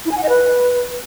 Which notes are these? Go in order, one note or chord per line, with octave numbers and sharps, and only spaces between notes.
E4
G#5
F#5
D#5
B4